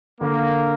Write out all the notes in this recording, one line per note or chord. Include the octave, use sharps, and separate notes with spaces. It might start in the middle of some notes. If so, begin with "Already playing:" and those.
D3 A#3